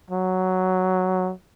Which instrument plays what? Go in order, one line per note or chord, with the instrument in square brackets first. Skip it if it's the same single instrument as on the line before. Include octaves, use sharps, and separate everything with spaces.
[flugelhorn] F#3